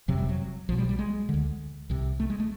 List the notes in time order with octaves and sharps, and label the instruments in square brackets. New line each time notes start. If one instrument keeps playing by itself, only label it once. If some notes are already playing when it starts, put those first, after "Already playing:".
[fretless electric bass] F#1 F2 C3 F#3
G3
F#3
B1 F3
B2
G3
G3
G#3
D2 D3
C2 C3
A3
G#3
A3